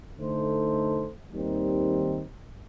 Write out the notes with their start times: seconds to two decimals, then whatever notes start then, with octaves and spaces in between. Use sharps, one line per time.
0.18 D3 A3 D#4 A4 C5
1.32 D#2 D#3 G3 C4 D#4